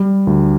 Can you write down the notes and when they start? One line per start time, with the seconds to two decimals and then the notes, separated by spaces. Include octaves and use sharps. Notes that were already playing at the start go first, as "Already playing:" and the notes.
Already playing: G3
0.27 D2